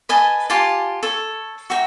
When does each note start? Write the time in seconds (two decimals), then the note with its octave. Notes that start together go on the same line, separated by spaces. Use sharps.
0.09 B4 D#5 G#5 A5
0.50 F4 G4 G#5 A5
1.03 A4 C#5
1.70 F#4 E5 G5 A#5